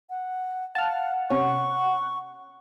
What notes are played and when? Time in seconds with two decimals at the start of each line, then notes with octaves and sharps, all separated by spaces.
0.10 F#5
0.75 F5 F#5 A5 F6
1.30 C3 C#4 C#6